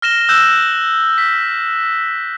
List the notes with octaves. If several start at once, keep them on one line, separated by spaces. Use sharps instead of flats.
F6 A#6 E7 G7
E6 F#6 G6 A#6 E7
B6